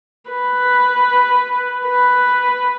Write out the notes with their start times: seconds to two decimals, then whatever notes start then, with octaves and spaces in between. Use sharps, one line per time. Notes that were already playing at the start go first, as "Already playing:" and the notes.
0.30 B4
1.87 B4